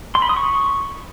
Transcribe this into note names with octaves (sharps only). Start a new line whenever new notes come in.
C6
B5
D#6
C#6